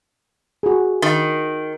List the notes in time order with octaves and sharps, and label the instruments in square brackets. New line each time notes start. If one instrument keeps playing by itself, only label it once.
[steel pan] F#4 G#4
[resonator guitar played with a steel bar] D#3